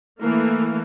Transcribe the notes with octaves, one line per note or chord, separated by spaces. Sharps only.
E3 A3 A#3